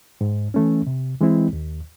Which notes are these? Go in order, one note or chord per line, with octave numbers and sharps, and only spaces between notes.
G#2
E3 A3 C#4
C3
E3 G#3 C4 E4
D#2